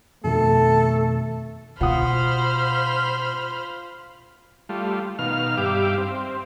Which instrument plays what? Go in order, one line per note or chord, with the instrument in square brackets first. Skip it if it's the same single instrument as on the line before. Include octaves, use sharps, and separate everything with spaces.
[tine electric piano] F2 B2 D#3 [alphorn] A3 [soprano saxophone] A4
[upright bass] B2 [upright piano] F4 F#5 D#6 [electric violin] C5 B5 [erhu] F6
[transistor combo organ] G3 A3 F4
B2 D#3 F5 F6
G2 G4 E5 F5 D6
C4